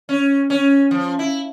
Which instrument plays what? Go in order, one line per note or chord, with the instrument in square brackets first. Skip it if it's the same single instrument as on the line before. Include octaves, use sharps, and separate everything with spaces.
[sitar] C#4
C#4
F3
E4